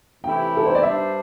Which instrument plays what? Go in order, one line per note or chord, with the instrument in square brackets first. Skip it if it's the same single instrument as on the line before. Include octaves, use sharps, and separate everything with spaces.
[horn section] C3 E3 A3 E4 G4 [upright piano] G5
[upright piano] A4
C5
D5
[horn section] G2 G3 D4 C5 [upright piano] E5